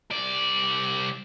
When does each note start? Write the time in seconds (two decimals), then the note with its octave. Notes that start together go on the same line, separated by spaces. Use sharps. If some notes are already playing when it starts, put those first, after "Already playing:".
0.11 C2 D5